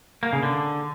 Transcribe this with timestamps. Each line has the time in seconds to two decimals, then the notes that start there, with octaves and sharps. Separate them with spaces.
0.23 A#3
0.33 C#3
0.43 D3